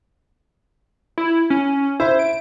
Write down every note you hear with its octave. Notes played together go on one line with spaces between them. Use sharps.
E4
C#4
E4 C5
D7